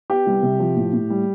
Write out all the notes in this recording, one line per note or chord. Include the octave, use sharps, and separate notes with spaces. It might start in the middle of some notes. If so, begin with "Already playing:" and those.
B3 G4
C2
C3
F3
A2
A2
G3